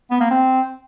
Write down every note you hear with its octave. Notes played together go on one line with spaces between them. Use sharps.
B3
A#3
C4